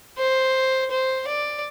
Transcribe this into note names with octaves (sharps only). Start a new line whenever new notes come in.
C5
C5
D5